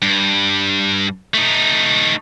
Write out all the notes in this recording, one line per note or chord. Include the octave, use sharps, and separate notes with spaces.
G2
A3 D#4